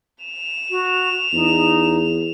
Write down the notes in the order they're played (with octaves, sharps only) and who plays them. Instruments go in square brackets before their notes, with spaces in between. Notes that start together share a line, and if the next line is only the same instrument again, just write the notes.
[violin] E7 F7
[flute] F#4
[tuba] E2 [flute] D#4